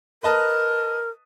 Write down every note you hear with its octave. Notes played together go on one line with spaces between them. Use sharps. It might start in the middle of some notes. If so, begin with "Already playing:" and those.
A#4 B4 D#5 A5